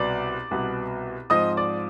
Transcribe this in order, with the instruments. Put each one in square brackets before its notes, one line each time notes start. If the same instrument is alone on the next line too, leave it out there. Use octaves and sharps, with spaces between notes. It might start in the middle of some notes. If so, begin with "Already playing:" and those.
Already playing: [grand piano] C2 B2 B3 D5 D6
C2 B2 B3
G#2 F3 C4 D#5 D#6
D5 D6